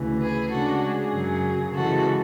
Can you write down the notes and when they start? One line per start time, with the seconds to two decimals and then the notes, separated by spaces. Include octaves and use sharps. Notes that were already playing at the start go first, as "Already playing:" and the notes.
Already playing: D2 C#3 E3
0.21 G#4 B4
0.51 C#3 G#3 D4 F#4 A4
0.83 G#4
1.13 F#2 C#3 F#3
1.75 C#3 E3 G#3 F#4 A4